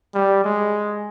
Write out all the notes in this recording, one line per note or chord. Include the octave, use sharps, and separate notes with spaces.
G3
G#3